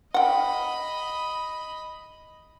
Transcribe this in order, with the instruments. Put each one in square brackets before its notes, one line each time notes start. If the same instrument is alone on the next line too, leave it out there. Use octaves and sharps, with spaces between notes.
[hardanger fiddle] D#5 B5 [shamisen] F#5 G5